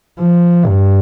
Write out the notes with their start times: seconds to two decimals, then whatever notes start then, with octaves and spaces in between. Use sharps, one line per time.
0.20 F3
0.66 G2